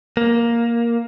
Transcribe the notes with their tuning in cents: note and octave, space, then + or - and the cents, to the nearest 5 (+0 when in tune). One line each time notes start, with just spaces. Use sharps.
A#3 +5